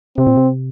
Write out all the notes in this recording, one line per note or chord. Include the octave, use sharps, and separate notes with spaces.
C3 C4
A#2
C3